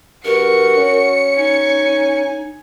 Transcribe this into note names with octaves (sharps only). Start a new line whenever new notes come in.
G2 F#4 A#4 C#7
C#4
D#4 G#5